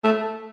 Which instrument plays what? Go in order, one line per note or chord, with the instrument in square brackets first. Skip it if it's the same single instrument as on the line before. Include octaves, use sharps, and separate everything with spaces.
[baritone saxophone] A3